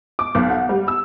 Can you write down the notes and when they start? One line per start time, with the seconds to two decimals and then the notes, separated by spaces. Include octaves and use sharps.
0.19 D6
0.35 B1
0.50 F#5
0.69 G3
0.88 E6